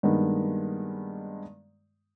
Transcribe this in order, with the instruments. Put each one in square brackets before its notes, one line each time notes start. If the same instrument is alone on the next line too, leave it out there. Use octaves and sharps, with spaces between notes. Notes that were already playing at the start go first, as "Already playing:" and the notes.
[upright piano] G2 D#3 G#3 A#3 B3